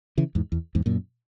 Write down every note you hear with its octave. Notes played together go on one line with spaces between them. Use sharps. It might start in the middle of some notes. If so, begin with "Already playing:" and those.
C#3 E3
E2 G#2
E2
E2 G#2
F#2 A#2